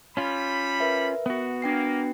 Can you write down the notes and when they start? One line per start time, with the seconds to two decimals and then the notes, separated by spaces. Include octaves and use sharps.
0.17 G3 C#4 F4 B5
0.80 A#4 B4 E5
1.26 B3 F#4
1.62 A#3 D4 G5 C7